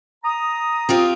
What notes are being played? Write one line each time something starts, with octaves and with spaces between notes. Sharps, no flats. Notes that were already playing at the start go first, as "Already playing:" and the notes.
A#5 D#6
C4 F4 G4